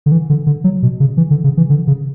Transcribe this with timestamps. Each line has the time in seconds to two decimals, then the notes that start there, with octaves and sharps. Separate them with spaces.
0.06 D3
0.12 E3
0.30 D3
0.47 D3
0.64 F#3
0.83 B2
1.00 C#3
1.17 E3
1.31 D3
1.44 C#3
1.57 E3
1.70 D3
1.87 C#3